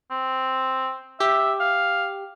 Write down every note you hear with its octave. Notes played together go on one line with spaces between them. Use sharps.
C4
G4 E5
F5